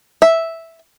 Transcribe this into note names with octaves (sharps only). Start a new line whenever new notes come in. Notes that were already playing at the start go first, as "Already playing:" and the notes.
E5